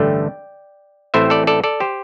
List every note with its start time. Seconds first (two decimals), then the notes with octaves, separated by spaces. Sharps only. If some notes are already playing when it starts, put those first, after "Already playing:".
Already playing: A1 G2 D3 A3 D5 G5
1.14 A1 A2 A3 C4 E4 C5 E5
1.30 A4 D5
1.47 A4 D5
1.64 A4 D5
1.80 G4 C5